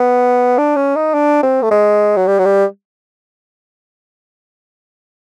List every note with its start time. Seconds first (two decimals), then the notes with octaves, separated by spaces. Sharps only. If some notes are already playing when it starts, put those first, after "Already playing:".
Already playing: B3
0.58 D4
0.76 C#4
0.96 D#4
1.14 D4
1.43 C4
1.62 A3
1.71 G#3
2.17 F#3
2.27 G3
2.39 F#3
2.45 G3